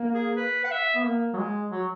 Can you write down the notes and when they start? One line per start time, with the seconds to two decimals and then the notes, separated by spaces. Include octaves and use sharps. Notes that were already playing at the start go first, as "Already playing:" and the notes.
Already playing: A#3
0.14 G#4
0.36 B4
0.64 F#5
0.71 E5
0.95 B3
1.04 A#3
1.33 F#3
1.38 G#3
1.71 F#3